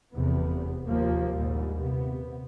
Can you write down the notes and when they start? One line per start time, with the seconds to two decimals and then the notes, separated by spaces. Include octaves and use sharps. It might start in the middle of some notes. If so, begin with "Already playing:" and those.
0.13 F1 E2 C3 B3
0.87 D#2 F3 A#3
1.34 A#1 D#2 G#2 G3
1.79 C3 B3